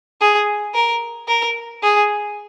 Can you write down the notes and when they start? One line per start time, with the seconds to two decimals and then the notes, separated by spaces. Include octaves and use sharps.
0.21 G#4
0.74 A#4
1.28 A#4
1.83 G#4